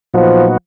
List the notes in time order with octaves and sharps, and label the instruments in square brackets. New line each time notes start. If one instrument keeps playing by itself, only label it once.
[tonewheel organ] A#2 F#3 B3 D#4 F#4 [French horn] F3